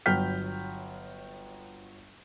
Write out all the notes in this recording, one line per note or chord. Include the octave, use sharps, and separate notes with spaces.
G1 F#3 G5 F6 G6 B6